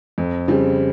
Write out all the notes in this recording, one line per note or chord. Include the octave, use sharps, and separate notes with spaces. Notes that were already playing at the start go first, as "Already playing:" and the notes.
F2
C#3 G3 C4